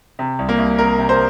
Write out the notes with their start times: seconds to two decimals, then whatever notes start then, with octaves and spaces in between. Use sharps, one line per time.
0.19 C3
0.39 C2
0.49 A#3
0.59 C2
0.78 C3 A#4
0.99 C3
1.09 C5